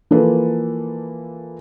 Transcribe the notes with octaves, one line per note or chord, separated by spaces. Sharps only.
E3 F3 A#3 A4 B4